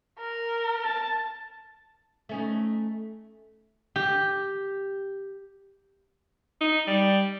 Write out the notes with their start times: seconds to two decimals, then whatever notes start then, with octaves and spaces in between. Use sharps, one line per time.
0.19 A#4
0.84 A5
2.29 A3 C#4 D#4
3.96 G4
6.61 D#4
6.87 G3